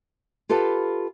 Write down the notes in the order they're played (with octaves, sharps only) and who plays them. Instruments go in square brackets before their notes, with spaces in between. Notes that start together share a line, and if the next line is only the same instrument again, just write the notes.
[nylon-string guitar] F4 G4 A4 B4 F5 A5